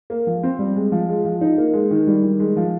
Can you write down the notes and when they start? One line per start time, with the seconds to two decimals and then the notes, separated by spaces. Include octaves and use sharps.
0.10 A#3
0.27 F3
0.43 C4
0.59 G3
0.76 G#3
0.92 F3
1.08 G#3
1.25 F3
1.41 D#4
1.58 A#3
1.73 G#3
1.91 D#3
2.07 G3
2.23 D#3
2.40 G#3
2.57 F3